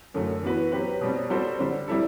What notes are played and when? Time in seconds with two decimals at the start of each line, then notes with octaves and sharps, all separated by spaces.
0.14 F#2 D3 A3
0.43 E3 B3 F#4 B4
0.72 F#3 C4 G4 B4
1.01 B2 G3 C4
1.30 G3 C4 F#4 A4 C5
1.59 D3 G3 C4
1.88 G3 C4 E4 A4